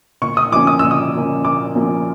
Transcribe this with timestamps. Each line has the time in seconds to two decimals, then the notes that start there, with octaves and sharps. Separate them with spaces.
0.22 A#2 C#6
0.37 D#6
0.52 F3 A#3 C#4 D6
0.67 D#6
0.79 A#2 E6
0.91 D#6
1.14 F3 A#3 C#4
1.45 A#2 D6
1.75 F3 A#3 C#4